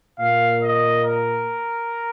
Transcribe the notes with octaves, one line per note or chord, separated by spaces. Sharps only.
A#2 A#3 F5
D#5
A#4